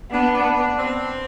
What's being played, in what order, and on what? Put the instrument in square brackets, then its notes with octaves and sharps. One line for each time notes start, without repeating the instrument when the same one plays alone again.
[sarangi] B3 [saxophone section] D4
[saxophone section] D4
D4
C4